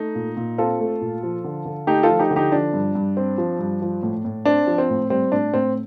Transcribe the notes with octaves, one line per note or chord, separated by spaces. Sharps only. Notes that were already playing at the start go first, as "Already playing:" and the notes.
Already playing: A3 D#4
A#2
A#2
C4 F4 A4
A3
A#2
F3
D3
D3
A3 D#4 G4
F4 A4
F3
D#4 G4
D3
D#4 G4
F3 D4
G2
G2
C4
F3
G2
F3
A2
A2
C4 D4
F3
C4
A2
G3 C4
A2 D4
A2 C4